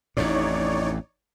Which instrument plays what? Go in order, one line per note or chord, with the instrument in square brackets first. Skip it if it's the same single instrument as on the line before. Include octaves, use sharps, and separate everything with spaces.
[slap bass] A1 F2 A2 [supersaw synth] D#4 C#5 D5